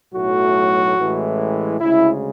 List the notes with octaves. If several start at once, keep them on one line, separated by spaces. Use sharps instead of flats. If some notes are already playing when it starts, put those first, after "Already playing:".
B1 A2 F#3 A3 F#4
A1 A2 E3 G#3
D2 C#3 G#3 E4